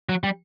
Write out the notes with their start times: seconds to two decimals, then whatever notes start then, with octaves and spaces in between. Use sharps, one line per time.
0.09 F#3
0.24 G3